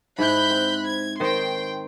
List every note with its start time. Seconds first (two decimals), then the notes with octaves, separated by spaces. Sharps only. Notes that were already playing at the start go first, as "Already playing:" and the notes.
0.18 G#2 E4 B5 F#6 G6
0.50 C4
0.85 G#6
1.20 D#3 D#4 C5 G5 C6